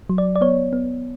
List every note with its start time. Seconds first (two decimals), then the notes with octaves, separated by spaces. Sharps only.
0.09 F#3
0.18 D5
0.36 D5
0.41 B3 C#5
0.73 B3